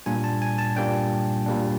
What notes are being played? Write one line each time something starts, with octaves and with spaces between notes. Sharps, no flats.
A#2 G3 A#3 D4 G#5
A5
G#5
A5
A#2 G3 A#3 D4 G5
A#2 G3 A#3 D4